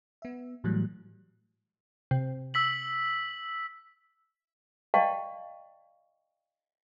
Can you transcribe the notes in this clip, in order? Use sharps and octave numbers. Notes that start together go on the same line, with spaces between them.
B3 E5
A2 E3 F#3 G3 A3 F#6
C3
E6 B6 F#7
D5 D#5 F5 G5 A5 C#6